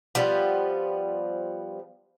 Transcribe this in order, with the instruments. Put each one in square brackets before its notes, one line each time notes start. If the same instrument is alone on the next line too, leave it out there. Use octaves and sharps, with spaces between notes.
[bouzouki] F3 G3 B3